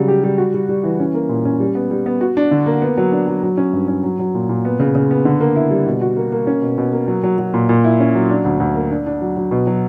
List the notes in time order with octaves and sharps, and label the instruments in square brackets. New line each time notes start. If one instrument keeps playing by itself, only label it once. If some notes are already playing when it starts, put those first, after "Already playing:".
Already playing: [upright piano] C#3 F#3 G3
G4
G3
F#4
G3
G3
E3
C#4
A#3
A#2
C#4
G3
B3
G3
B3
F#4
D4
D3
A#3
B3
F#3
D4
F#3
F#3
C#4
G2
C#4
F#3
F#3
A#2
A#2
B3
C#3
C#3
B3
D3
A#3
E4
G3
B2
F#4
A#3
A#3
C#4
B2
B2
A#3
F#3
F#3
F#3
A#2
A#2
E4
C#4
F#3
D4
D2
D2
A#3
D4
D4
F#3
F#3
B2
F#3